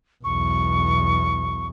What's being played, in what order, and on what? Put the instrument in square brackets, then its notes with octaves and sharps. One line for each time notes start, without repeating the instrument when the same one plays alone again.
[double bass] B1 E2 [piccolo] C#6